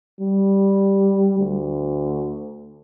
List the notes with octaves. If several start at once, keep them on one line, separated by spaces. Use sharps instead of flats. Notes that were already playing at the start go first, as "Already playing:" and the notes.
G3
D2